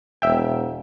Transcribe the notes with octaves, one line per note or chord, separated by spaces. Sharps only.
E1 E5 G5